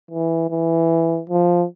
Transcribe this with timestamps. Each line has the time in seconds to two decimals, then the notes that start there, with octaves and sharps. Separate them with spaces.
0.11 E3
0.50 E3
1.30 F3